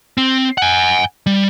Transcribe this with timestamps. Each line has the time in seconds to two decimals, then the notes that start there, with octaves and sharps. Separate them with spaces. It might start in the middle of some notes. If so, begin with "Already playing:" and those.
0.18 C4
0.58 F#5 G#5
1.26 G3